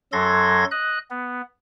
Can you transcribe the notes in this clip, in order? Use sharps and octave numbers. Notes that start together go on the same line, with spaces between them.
F#2 F#3 A4 C6 G#6 A#6
D#5 F#6
B3